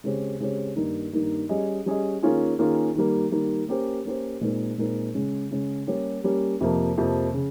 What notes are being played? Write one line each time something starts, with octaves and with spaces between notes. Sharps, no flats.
C#3 G#3 C4 G4 C#5
C#3 G#3 C4 G4 C#5
G2 D#3 A#3 D#4
G2 D#3 A#3 D#4
G3 C#4 G#4 D#5
G3 C#4 G#4 D#5
D#3 A#3 C#4 F4 G#4
D#3 A#3 C#4 F4 G#4
D#3 G3 A#3
D#3 G3 A#3
A#3 C#4 G4 C5
A#3 C#4 G4 C5
A#2 G#3 C4 D#4 A#4
A#2 G#3 C4 D#4 A#4
C#3 G#3 C#4
C#3 G#3 C#4
G3 A#3 C#4 G4 C#5
G3 A#3 C#4 G4 C#5
F2 C3 F3 A#3
F2 C3 F3 A#3
C#3